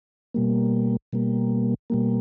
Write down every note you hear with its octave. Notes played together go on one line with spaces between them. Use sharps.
B2 G3 A#3
B2 G3 A#3
B2 G3 A#3